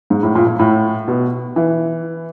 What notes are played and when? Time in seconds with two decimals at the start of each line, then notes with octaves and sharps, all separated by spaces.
0.10 G#2
0.23 A2
0.35 A#2
0.47 A#2
0.59 A2
1.08 B2
1.56 E3